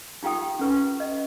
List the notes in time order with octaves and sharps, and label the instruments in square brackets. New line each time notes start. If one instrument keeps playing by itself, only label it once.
[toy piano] D#4 F4 G4 G5 D#6
C#4 B4 C#6
D#5